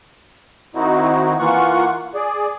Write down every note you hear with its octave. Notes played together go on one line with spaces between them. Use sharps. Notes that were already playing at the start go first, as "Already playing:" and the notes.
D#3 C4 D#4 E4 F#4
E3 A#3 F4 F#5 C#6
G#4 D5